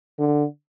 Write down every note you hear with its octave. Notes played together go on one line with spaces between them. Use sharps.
D3